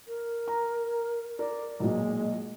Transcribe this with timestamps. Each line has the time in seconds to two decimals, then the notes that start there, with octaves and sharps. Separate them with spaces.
0.08 A#4
0.48 A#5
1.39 A#4 D5
1.80 B1 A#2 G#3